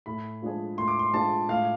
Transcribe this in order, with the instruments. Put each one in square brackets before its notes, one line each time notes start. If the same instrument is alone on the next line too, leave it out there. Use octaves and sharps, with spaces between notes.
[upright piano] A2 [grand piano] B5
[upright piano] F3 G#3 D4 G#4
[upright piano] A2 [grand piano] C6
[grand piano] D6
C6
[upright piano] F3 G#3 D4 G#4 [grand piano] A5
[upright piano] A2 [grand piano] F5